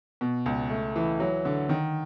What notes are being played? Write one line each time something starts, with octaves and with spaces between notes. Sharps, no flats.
B2
C#2
A3
E3
F#3
D3
D#3